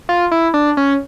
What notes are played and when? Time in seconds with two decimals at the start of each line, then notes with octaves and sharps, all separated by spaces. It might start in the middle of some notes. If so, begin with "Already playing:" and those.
0.09 F4
0.31 E4
0.54 D4
0.77 C#4